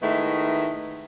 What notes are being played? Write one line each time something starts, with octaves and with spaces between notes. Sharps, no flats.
D#3 G#3 A3 B3 E4